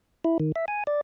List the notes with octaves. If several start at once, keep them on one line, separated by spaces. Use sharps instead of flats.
E4
D#3
E5
G#5
D5